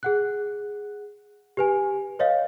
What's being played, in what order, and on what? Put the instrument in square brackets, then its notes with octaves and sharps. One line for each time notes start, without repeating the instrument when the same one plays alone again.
[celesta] G#4 F#5 F#6
G4 B4 G#5
B4 C#5 D#5 F5